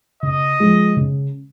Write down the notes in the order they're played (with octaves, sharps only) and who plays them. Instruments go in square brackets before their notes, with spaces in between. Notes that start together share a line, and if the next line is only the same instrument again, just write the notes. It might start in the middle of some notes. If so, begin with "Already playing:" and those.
[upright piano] C#3 [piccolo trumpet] D#5
[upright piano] F3 G#3
C#3